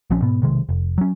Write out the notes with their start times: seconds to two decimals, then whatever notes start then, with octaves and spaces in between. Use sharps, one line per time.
0.10 A#1 F3 C4 C#4
0.22 G#2 B2 B3
0.42 B1 C3 D#3 G#3
0.69 F1
0.98 F#3 C#4